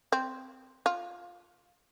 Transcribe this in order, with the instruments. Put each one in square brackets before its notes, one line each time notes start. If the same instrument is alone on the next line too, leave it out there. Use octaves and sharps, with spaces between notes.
[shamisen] C4
F4